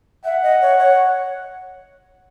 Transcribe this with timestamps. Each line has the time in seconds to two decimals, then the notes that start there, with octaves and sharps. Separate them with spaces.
0.25 E5 F#5
0.43 D#5
0.61 C#5
0.79 C#5